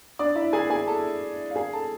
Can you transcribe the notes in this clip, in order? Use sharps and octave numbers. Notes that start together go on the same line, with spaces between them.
D4 D5
E4 E5
G#4 G#5
G#4 G#5
A4 A5
F5
G#4 G#5
A4 A5